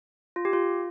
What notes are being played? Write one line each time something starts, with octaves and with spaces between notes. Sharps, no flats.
F4
G4
F4